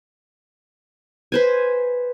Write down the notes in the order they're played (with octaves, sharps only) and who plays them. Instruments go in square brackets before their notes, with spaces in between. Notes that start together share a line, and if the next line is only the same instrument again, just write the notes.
[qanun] B4 C5 G#5